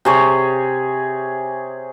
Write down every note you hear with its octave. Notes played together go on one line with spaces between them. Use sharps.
C3 G#4 C#5